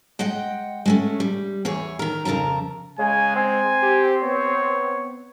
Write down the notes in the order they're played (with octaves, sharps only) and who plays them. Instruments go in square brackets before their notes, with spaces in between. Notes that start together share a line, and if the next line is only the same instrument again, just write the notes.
[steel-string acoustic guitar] G#3 D#5 F#5 G5
G#3 A3 C#4
G3
E2 E3 G#4 C#5
D#3 A#4
F2 C#3 A#4 A5 A#5
[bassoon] C#3 [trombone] G#3 [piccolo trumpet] G#5
[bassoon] C4 [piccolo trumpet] G#5
[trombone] G4
[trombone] B3 [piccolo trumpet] C#5